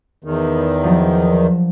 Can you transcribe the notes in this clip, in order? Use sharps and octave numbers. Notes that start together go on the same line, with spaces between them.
E2 D#3
F3 F#3 D4